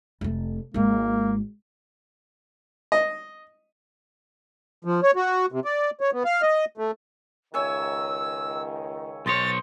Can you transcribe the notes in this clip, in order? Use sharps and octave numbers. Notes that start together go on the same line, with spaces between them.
F1 A3
G#1 G#3 A#3
D#5
F3
C#5
F#4
C3
D5
C#5
B3
F5
D#5
A3
C#2 D#3 C#5 E5 G#5 E6
B1 C5 C#5 D#5 C6 A6